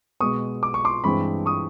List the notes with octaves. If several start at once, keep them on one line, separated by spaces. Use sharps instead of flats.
B2 G#3 B3 C#6 D#6
D6
C#6
C6 D6
G2 E3 G#3 C4 B5 C#6
C#6 D#6